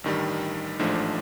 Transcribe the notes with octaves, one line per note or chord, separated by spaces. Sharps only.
A1 G2 D#3 G3
A1 G#2 F3 A3 D4